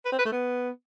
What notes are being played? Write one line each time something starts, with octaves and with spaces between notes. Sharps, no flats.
B4
C4
B4
A3
B3